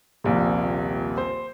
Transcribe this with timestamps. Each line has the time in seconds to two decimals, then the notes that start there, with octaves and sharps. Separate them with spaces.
0.24 D#1 A#1 C3
1.18 C5